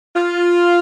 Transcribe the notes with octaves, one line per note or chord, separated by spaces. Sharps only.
F4